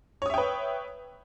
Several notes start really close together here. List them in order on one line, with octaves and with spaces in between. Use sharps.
C#5 D#6 E5 G5 B4